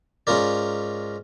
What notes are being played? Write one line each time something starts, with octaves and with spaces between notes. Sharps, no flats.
G#2 C#4 F4 A#4 D5